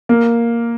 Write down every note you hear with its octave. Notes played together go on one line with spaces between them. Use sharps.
A#3